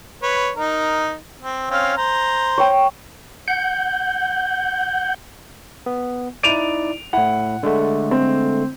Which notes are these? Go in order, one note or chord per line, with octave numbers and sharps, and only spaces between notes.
B4 C#5
D#4 A#4
C4
C4 C#4 F5
C5 A#5
C#5 G5
F#5 G6
B3
D#4 E4 D5 D7 D#7 F7
A2 E4 F#5
D3 G#3 A3
C4